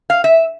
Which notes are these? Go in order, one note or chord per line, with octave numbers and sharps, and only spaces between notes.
F5
E5